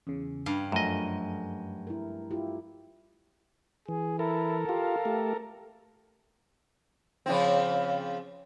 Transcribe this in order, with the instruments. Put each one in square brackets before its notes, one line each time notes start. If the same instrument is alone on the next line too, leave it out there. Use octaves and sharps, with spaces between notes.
[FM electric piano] E2 C#3 [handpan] C#4
[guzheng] G2 F5
[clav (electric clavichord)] F#2 D#5 [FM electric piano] F3 F#3 [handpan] A3
[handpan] E4 A#4
E4 F4 G4
[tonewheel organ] E3 [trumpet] G#4
[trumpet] E4 [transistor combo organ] A4 A#4
[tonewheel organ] F4 G4 [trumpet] F5
[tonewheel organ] A3 G4
[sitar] C#3 F3 C4